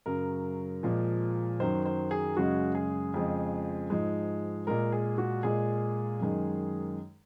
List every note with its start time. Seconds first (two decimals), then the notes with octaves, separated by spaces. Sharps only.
0.06 F#2 C#3 F#3 A#4
0.83 A#2 F3 G#3
1.60 F#2 D#3 F#3 C5
1.85 C5
2.11 G#4
2.37 F#2 C#3 G#3 F#4
2.75 G#4
3.14 F2 C#3 F3 G#3
3.90 G#2 F3 G#3
4.67 A#2 G#3 A#4
4.92 G#4
5.18 F#4
5.43 A#2 G#3 G#4
6.20 F#2 D#3 G#3